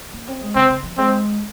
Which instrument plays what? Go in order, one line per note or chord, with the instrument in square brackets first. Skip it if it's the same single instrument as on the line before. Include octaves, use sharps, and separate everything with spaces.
[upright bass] A#3
C4
G#3
[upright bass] C#3 [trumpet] C4
[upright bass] C#3
F3
[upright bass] G#3 [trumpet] C4